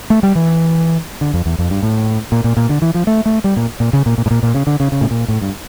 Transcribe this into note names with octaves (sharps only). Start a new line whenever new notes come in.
A3
G3
E3
D3
F2
E2
F2
G2
A2
A#2
A#2
A#2
D3
E3
F3
A3
A3
G3
A#2
A#2
C#3
A#2
A#2
A2
A#2
A#2
C#3
D3
C#3
C#3
A2
A#2
A2
G2